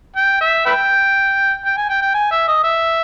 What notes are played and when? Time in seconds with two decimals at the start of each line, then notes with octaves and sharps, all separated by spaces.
0.17 G5
0.41 E5
0.66 B4 E5 G5
1.65 G5
1.77 G#5
1.89 G5
2.02 G5
2.14 G#5
2.31 E5
2.48 D#5
2.64 E5